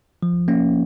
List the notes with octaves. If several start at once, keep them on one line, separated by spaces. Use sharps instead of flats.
F3
A#3 C#4